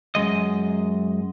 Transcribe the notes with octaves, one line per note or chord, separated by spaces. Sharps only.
F#2 G#3 D#5